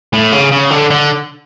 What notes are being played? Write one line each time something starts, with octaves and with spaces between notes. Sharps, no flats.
A2
C#3
C#3
D3
D3